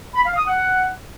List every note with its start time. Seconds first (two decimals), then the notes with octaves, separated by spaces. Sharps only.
0.15 B5
0.26 F5
0.37 D#6
0.48 F#5